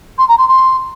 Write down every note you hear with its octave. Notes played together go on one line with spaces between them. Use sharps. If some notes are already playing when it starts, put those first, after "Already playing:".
C6
A#5
C6
C6